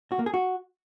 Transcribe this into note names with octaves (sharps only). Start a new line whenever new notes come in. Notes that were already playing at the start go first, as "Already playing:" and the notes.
F#4
A#3
G#4
F#4